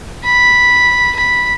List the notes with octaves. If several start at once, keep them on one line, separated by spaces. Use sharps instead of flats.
B5
B5